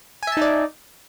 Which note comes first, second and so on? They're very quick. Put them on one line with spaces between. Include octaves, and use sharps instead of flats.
G#5 E5 A5 D#4 D5